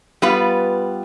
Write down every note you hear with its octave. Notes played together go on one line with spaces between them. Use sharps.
G3 B3 F4 B4